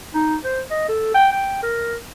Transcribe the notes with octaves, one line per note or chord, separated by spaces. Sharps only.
D#4
C5
D#5
A4
G5
G5
A#4